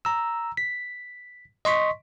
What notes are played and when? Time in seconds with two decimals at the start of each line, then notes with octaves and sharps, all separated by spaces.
0.05 A#5 E6
0.57 B6
1.65 D#5 C6 C#6 B6